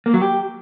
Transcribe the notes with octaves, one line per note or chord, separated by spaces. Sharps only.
A#3
F#3
G4